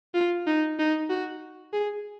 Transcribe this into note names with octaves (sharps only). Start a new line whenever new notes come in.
F4
D#4
D#4
F#4
G#4